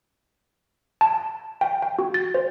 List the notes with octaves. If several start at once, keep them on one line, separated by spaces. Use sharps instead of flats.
A5
G5
G5
F#4
A6
C5